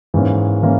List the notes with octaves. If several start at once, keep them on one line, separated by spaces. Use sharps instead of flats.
G#2 E3 A#3 C#4
E3 A#3 C#4